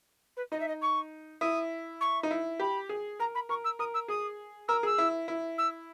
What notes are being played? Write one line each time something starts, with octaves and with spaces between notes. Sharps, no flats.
B4
D#4 D#5
E5
D#5
C#6
E4 D#6
C#6
D#4
E4
G4 B5
G#4
A#4 A#5
B5
A#4 C#6
E6
A#4 D#6
E6
G#4 D#6
A#4 E6
G#4 E6
E4
E4
E6